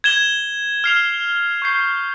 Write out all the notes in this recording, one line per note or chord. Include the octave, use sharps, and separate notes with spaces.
G#6 E7 G7
F6 C7 F7
C#6 G6 C7